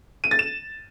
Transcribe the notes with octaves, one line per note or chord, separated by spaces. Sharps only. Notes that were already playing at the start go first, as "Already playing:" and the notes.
D#7
A6
E7